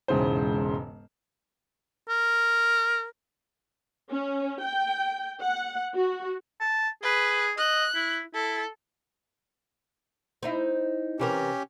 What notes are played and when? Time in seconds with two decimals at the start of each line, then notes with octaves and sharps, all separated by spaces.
0.08 E1 G#2 C#3 E3 C5
2.09 A#4
4.12 C#4
4.62 G5
5.41 F#5
5.95 F#4
6.60 A5
7.03 G#4 B4
7.58 D#5 F#6
7.95 E4
8.34 E4 A4
10.43 C4 D#4 E4
11.20 C3 E3 C#4 G4 A#4